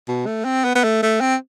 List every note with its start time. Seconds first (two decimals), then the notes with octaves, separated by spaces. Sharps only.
0.08 B2
0.26 A3
0.45 C4
0.65 B3
0.75 B3
0.84 A3
1.03 A3
1.21 C4